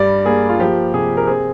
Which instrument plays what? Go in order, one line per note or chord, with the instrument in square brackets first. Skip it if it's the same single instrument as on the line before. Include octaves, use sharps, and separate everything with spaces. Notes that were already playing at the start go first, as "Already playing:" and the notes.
Already playing: [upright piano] G2 G3 D5
A#3 G#4
F4
F3 G4
C3 G#4
A#4
C4 G#4